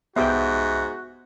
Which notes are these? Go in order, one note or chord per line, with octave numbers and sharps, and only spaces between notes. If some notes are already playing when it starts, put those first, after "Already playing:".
C2 G#2 B3 F#4 G4 E5 G5